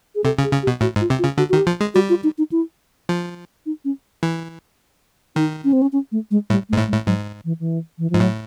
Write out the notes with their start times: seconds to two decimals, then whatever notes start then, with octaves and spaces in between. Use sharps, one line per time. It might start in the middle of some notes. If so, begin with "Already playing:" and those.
0.15 G#4
0.24 C3 A4
0.39 C#3
0.43 G#4
0.53 C#3
0.63 G4
0.67 B2
0.81 A2 F#4
0.96 G#2
1.01 F4
1.10 C3
1.19 F4
1.24 C#3
1.38 D3 F#4
1.49 F#4
1.53 D#3
1.57 G4
1.67 F3
1.81 G#3
1.94 G3 F#4
2.09 F4
2.24 D#4
2.38 D#4
2.52 E4
3.09 F3
3.66 D#4
3.85 C#4
4.23 E3
5.36 D#3 D#4
5.64 C#4
5.73 C4
5.82 C#4
5.93 C#4
6.12 A3
6.31 G#3
6.50 A2 G3
6.69 A3
6.73 G#2
6.78 A2
6.88 G#3
6.93 A2
7.06 G#2 F#3
7.45 E3
7.60 E3
7.98 E3
8.10 G#2 F3
8.20 A2 F#3